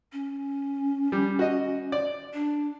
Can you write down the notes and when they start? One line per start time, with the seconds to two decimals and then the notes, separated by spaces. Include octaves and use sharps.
0.13 C#4
1.12 G3
1.39 F#4 D#5
1.92 D5
2.34 D4